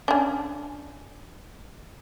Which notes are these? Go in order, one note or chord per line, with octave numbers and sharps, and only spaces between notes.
C#4 D4